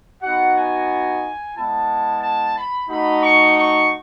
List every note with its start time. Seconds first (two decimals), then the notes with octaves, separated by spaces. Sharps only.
0.23 B3 D#4 F#4 F#5
0.56 G#5
1.56 G#3 B3 E4 A5
2.22 A5
2.56 B5
2.89 A3 D#4 F#4 B5
3.23 C#6
3.57 C#6